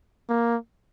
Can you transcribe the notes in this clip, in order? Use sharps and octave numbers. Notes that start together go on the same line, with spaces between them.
A#3